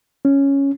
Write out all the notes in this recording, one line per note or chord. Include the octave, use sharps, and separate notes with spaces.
C#4